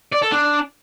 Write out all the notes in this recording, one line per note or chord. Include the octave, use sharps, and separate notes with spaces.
D5
A4
D4